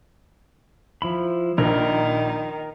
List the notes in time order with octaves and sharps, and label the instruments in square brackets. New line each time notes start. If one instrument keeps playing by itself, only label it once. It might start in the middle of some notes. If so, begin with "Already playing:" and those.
[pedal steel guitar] F3 E4 B5
[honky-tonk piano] A#1 [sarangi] D#3 [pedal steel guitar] A#4